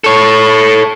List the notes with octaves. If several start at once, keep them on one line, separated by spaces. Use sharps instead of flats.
A4 C#5